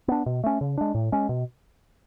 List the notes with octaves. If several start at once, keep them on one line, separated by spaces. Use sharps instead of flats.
B3 D4
B2
A3 C#4
C#3
G#3 D4
A2
G#3 C#4
B2